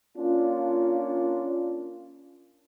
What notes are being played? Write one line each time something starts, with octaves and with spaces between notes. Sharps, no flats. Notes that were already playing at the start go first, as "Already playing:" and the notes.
A#3 C#4 D4 F4